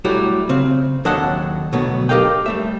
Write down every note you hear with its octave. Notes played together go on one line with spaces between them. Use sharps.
F#3 G3 A3 E4 F#4 G4
C#3 C4
D#2 F#3 D4 A4 D#5 F#5
B2 D3 F#3 A3 B3
G4 A4 A#4 D#5 F5 G5
G3 A3 E5